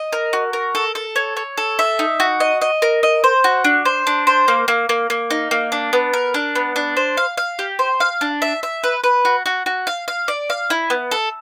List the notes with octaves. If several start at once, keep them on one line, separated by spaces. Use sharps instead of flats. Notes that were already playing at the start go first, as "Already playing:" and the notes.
Already playing: D#5
A#4
F#4
A#4
A4
A4
C#5
C#5
A4
E5
D#4
F#4
D#5
D#5
A#4
D#5
C5
F#4
D4
C5
D4
C5
A#3
A#3
A#3
A#3
D#4
A#3
D4
B3
A#4
D4
B3
D4
C5
F5
F5
G4
C5
F5
D4
E5
E5
B4
B4
F#4
F#4
F#4
F5
F5
D5
F5
E4
B3
A4